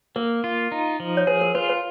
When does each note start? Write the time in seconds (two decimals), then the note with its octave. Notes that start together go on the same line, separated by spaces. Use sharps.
0.16 A#3 A#4
0.44 F4
0.72 D#4
1.00 F3
1.17 C#5
1.27 G#4 B4
1.41 A#4
1.55 F4 B4
1.69 B4